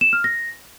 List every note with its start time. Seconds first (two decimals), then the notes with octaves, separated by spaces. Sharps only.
0.01 E7
0.13 F6
0.24 A#6